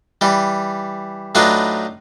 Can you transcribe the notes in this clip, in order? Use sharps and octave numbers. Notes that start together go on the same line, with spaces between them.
E3 G3
A2 F#3 D4 D#4 F4 B4